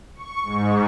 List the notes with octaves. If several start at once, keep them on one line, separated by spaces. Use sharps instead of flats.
C#6
G#2